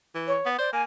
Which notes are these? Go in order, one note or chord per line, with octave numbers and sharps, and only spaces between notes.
E3
C#5
B3
C5 D5
A#3 G#5